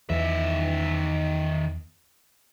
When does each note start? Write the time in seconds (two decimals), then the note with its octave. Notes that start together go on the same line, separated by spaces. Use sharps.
0.10 E2 D#3 E5